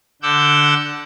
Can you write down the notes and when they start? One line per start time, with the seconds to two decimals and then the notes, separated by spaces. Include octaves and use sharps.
0.22 D3 F#5 D6 E6 G6